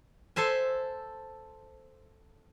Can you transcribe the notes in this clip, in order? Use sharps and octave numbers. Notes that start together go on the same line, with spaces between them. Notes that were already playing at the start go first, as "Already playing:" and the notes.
A4 C5 E5 G#5